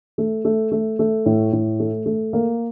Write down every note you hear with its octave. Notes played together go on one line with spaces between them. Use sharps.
A3
A3
A3
A3
A2
A2
A3
A3
A#3